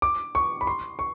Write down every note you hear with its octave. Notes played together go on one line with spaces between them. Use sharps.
D6
C#6
B5
C6
C#6